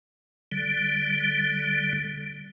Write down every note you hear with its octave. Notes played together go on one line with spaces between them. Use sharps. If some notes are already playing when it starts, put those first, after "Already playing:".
D3 G3